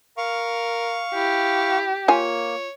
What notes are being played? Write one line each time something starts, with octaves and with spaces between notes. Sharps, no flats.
A#4 F5 C#6
E4 G4
A#3 F4 C#5 G#5